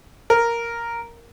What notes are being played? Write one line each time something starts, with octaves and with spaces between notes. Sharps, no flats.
A#4